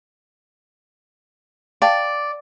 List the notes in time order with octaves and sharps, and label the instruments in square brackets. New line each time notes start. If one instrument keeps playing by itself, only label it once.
[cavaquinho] D5 [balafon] F5 G5 A5